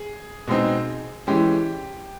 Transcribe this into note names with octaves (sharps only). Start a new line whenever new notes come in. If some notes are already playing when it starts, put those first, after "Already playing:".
Already playing: G#4
B2 G#3 C4 D#4
E3 G#3 C#4 G4